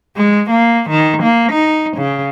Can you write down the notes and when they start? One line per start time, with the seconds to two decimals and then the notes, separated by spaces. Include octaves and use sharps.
0.17 G#3
0.51 A#3
0.90 D#3
1.23 A#3
1.53 D#4
1.97 C#3